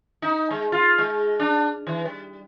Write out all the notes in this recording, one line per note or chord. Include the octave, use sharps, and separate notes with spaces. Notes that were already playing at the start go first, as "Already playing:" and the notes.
D#4
G#3
F4
G#3
D4
E3
G3